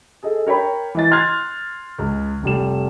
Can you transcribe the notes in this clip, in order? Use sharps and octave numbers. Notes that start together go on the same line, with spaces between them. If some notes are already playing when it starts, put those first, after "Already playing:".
G#4 A4 D#5
A#4 C#5 G5 B5
E3 D#5 A6
C6 F6 F#6 G#6 A6
C#2
F1 G3 E7